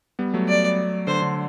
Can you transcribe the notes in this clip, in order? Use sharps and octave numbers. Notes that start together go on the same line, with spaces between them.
G3 B3
F#3 A3
D5
D3 C5
D3